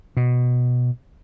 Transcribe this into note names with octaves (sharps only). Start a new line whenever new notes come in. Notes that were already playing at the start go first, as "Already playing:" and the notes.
B2